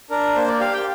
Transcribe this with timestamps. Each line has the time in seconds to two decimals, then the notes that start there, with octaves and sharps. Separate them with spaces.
0.10 D4 A#4
0.35 A#3 C5
0.48 D5
0.60 G4 F5
0.73 G5